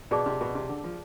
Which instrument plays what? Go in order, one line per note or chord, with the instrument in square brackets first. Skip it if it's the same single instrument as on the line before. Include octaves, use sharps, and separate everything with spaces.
[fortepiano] B2 [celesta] G#4 D5 A5 D6
[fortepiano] C3
B2
C3
D3
F3